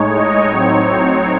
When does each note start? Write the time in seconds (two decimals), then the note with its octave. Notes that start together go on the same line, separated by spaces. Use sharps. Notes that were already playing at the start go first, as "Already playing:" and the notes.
Already playing: A2 G#3 D#4 C#5
0.13 D#5
0.48 A2 F#3 C4 D#4 C#5